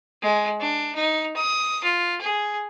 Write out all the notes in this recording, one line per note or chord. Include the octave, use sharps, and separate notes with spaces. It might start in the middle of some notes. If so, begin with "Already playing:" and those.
G#3
D4
D#4
D#6
F4
G#4